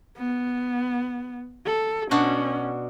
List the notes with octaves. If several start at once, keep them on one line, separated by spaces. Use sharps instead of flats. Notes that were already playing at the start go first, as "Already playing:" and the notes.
B3
A4
B2 C#4 D4 F#4